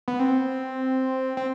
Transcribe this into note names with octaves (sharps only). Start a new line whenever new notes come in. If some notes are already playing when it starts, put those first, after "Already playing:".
B3
C4
C4